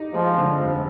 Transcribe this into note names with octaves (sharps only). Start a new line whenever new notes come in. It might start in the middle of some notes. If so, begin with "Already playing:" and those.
Already playing: D#4 G4
F3 G#3
D3
F1